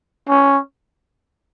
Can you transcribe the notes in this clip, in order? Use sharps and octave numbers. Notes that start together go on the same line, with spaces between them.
C#4